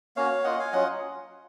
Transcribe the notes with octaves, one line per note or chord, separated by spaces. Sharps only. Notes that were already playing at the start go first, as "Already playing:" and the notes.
A#3 C#4 F#4 C#5 F5
A#3 F4 D#5 F#5
F5 G#5
F#3 C#4 F4 D#5 F#5